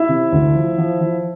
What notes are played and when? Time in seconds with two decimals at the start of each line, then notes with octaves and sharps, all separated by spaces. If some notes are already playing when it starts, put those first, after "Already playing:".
Already playing: E4 E5
0.09 C3
0.32 D2
0.55 F3
0.78 F3
1.00 F3